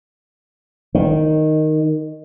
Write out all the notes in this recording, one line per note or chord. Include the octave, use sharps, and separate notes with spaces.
D#3